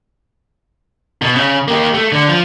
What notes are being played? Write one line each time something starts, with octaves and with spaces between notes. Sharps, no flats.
B2
C#3
A#3 G4
A3
D3
F3